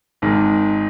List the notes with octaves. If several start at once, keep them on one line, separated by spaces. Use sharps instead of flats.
G#1 G#2 D#3 G#3